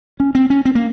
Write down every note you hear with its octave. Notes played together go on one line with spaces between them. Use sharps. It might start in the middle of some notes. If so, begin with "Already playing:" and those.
C#4
C4
C#4
C4
A#3